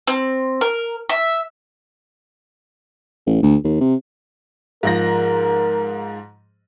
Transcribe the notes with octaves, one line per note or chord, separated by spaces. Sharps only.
C4
A#4
E5
A1
D2
D#2
C3
G#2 F3 A#4 A#6